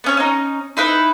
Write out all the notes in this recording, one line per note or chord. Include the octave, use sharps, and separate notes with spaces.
B3 C#4 C#5
C#4 D#4
D#4 E4 B4